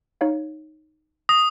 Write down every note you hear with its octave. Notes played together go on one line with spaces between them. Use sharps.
D#4 C#5 F5
D#6 A#6